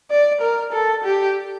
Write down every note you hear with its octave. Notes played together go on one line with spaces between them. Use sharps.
D5
A#4
A4
G4